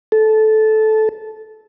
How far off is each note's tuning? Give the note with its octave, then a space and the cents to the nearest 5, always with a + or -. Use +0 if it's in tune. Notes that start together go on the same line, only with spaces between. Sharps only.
A4 -15